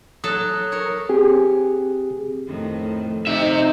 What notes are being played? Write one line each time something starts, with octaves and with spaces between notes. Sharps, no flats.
F#3 A4 A5 D#6 F#6
A#4 C#5
C4 G4 G#4
F2 A2 D#3
C3 D#4 E5